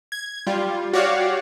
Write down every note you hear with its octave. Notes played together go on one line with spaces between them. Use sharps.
G#6
G3 F4
F#4 G4 C#5 D5 F5 F#5